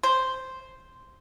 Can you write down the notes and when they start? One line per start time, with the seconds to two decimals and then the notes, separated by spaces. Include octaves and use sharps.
0.03 C5